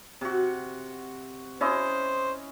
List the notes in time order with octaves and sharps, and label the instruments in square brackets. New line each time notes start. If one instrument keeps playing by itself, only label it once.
[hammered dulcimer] C3 F#4
[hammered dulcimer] C#4 E4 D#5 [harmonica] C5